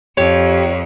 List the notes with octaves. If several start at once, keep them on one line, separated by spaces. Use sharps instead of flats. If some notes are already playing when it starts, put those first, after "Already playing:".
F2 G4 C#5